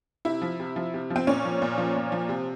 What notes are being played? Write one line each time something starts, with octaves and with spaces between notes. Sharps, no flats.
C3 E4
F3
C3
F3
C3
F3
C4
A#2 C#4
F3
A#2
F3
A#2
F3
C3